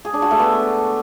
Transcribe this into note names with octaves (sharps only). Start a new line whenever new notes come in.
G#4
D4
F#4
A3
B3